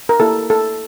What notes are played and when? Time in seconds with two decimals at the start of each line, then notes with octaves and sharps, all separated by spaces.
0.09 A#4
0.20 A#3 E4 G4 A4
0.50 A4